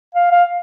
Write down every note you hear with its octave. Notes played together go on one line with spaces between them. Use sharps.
F5
F5